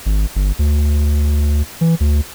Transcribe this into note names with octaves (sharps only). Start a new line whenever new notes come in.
G#1
G1
D2
E3
D2